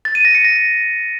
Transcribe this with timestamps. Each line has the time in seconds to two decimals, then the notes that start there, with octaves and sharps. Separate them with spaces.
0.05 A6
0.15 D#7
0.25 A#6
0.35 C#7
0.45 A#6